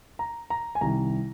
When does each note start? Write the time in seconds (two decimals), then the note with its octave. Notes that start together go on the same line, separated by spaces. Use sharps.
0.19 A#5
0.50 A#5
0.75 G#5
0.81 C2 C3 D#3 A#5